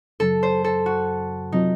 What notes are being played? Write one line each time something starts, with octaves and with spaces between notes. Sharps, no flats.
F#2 C#3 F#3 A4
C5
A4
F#4
C3 F#3 C4 D#4 F4